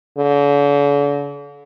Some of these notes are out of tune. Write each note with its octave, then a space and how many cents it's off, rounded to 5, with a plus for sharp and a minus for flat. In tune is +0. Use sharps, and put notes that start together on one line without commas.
D3 -45